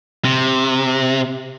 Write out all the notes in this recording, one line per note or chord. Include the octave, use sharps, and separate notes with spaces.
C3